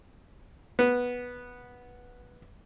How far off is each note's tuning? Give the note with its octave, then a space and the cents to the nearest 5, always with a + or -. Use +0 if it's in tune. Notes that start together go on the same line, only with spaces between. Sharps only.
B3 -5